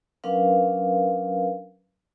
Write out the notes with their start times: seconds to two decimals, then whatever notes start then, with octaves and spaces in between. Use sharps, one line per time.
0.24 F#3 C#4 D4 A#4 B4 F5